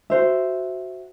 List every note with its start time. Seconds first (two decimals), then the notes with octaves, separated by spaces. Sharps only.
0.10 F#4 C5 E5